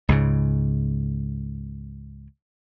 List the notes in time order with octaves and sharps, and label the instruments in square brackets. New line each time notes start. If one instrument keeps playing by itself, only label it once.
[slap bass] C#2 G#2 C#3